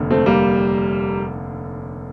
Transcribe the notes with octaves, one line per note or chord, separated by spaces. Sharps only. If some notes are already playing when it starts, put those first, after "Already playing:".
Already playing: F1 D#2 D3
A3 C4
G3 A#3